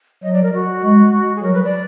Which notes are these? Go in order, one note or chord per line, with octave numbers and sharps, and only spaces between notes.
F#3 D#5
D5
A#4
F#4
G#3
G#4
F#3 A#4
B4
D5